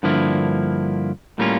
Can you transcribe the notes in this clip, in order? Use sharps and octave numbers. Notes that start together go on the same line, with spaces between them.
G2 D3 F3 A#3 E4
A2 G3 A#3 C#4 F4